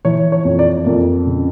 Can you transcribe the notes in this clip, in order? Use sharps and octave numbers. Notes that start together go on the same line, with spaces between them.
E3 C#5
C#5
F2
D5
F2 A#4
C#3